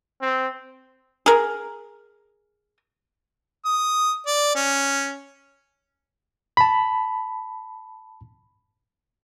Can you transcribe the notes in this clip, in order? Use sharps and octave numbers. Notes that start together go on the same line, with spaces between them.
C4
G#4 A#4
D#6
D5
C#4
A5 B5